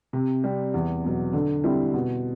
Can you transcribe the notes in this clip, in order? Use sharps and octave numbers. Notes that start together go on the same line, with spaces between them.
C3
G3 C4
E2
B2 F#3
D3
G3 C4 E4
B2